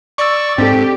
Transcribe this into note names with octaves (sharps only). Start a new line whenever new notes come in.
D5 C#6 E6
G#2 C4 G4 A4